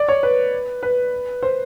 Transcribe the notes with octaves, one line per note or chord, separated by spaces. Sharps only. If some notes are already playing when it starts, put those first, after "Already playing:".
Already playing: D5
C#5
B4
B4
C5